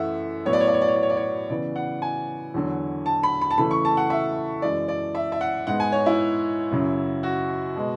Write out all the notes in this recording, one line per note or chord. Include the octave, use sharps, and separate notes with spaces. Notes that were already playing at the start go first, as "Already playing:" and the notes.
Already playing: F#2 E3 A3 E5 F#5
A2 F#3 B3 C#5
D5
C#5
D5
C#5
D5
C#5
D5
C#5
D5
C#5
C#3 E3 B3 D5
F#5
G#5
E2 D3 F#3
A5
B5
B5
A5
C#3 E3 A3 B5
C#6
A5
F#5
E5
F#2 E3 G#3 D5
D5
E5
E5
F#5
G#2 G#3 B3 F#5
G#5
C#5
E4
F#2 C#3 F#3
F#4
B2 G#3 B3